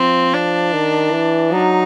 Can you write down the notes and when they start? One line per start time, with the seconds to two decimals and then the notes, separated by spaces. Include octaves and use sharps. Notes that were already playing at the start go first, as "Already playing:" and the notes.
Already playing: F3 C4
0.34 D4
0.73 D#3
1.13 E3
1.52 F#3 D#4